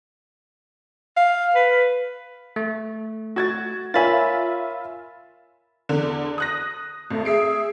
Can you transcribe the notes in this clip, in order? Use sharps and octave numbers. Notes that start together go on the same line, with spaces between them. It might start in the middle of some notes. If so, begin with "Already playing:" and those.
F5
B4
A3
F#4 G#6 A6
F4 A#4 C#5 E5 G#5 B5 A6
E2 D3
D#6 F#6 A#6
G#1 A3
G#4 E5 C7 D7